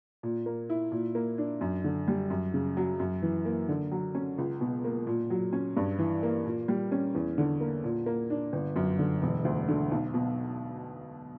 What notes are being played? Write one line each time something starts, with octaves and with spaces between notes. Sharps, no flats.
A#2
A#3
E4
A#2
A#3
D4
F#2
D3
G3
F#2
C#3
F#3
F#2
E3
A#3
D3
F#3
C#4
C#2
B2
A#3
A#2
F#3
C#4
G2
E3
A#3
A#2
G3
C#4
E2
D3
A#3
A#2
A#3
D4
G1
F#2
D3
E1
D2
D3
B1
B2